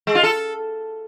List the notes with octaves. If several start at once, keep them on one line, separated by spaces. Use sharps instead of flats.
G#3
F4
A4